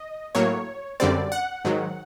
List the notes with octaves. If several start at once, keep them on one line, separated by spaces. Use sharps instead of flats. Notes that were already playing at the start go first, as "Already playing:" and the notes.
Already playing: D#5
A2 F#3 A#3 C#5
F#2 D3 G3 C4 D5
F#5
G#2 D#3 F#3